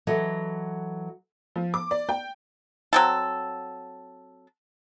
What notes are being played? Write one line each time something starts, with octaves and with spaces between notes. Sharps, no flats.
E3 F#3 A4 D#5
F3
D6
D5
G5
F#3 C4 A4